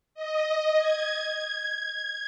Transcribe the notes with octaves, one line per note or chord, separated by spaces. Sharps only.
D#5
G#6